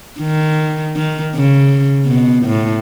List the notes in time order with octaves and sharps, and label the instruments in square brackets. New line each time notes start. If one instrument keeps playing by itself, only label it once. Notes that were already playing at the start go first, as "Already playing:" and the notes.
[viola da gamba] D#3
D#3
C#3
B2
A2